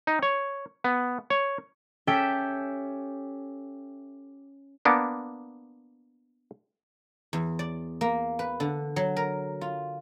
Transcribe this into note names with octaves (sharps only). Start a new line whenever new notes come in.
D#4
C#5
B3
C#5
C#4 G4 A4 E5 G5
A#3 B3 D4
E2
D5
A#3
B4
D3
F#3
A#4
F4